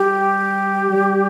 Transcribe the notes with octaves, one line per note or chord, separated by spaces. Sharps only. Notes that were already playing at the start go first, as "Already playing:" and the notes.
Already playing: G3 G4
G3